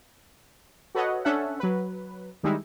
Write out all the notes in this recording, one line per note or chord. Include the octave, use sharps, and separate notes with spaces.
F#4 A4 B4 C#5 D#5 F#5
C#4 D4 A4 E5 F#5
F#3 B4
D#3 G3 G#3 D#4 E4